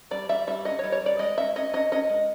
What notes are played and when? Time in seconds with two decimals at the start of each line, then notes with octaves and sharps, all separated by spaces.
0.11 G3 D5
0.29 G3 E5
0.47 G3 E5
0.65 C#4 D#5
0.79 C#5
0.84 G3
0.92 C#5
1.02 G3 D5
1.19 G#3 D#5
1.37 C#4 E5
1.56 C#4 D#5
1.73 C#4 D#5
1.92 C#4 D#5
2.09 G#3